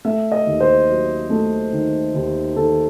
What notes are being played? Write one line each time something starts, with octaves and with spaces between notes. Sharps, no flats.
A3 E5
D#5
D#2
C5
F#3
A3
D#3
D#2
D#3 A4